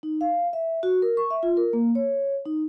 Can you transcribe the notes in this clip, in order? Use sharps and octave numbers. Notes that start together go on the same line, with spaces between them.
D#4
F5
E5
F#4
A#4
C#6
E5
F4
A#4
A#3
C#5
D#4